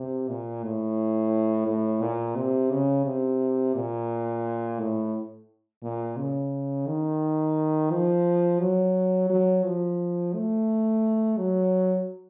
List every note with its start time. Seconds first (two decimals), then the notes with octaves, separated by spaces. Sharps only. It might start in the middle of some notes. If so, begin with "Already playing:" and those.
Already playing: C3
0.28 A#2
0.63 A2
1.67 A2
2.02 A#2
2.36 C3
2.71 C#3
3.05 C3
3.75 A#2
4.79 A2
5.83 A#2
6.17 C#3
6.87 D#3
7.91 F3
8.60 F#3
9.30 F#3
9.64 F3
10.34 A3
11.37 F#3